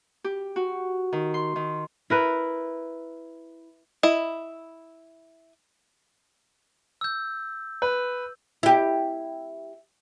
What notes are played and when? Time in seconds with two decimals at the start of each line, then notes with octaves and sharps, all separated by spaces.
0.24 G4
0.56 F#4
1.13 D#3
1.34 C6
1.56 D#3
2.10 E4 A#4 B4
4.03 E4 D#5
7.01 E6 G6
7.82 B4
8.63 E4 G4